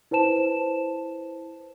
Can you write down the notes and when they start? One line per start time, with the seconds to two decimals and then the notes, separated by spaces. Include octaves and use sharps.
0.11 E4 B4 C5 A5 E7